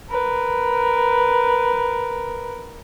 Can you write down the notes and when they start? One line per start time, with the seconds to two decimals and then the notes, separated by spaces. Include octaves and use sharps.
0.10 A#4 B4